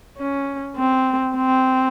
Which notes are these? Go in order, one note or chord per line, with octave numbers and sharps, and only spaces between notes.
C#4
C4
C4